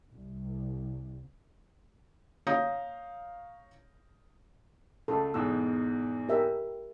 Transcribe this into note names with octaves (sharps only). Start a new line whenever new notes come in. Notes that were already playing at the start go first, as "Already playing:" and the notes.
C2
C#5 F5 A#5 D#6 G6 A#6
C#2 A3 A4
E2 G#2 B2 E6
G4 A#4 E5